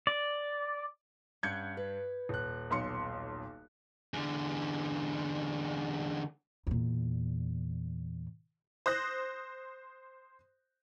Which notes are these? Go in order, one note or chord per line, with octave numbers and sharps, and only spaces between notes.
D5
G2 C#4 F#5 G6 G#6 C#7
B4
D#1 F#6
B1 C6 C#7
E2 D3
E2 A#2
C5 D#6 F#6 A#6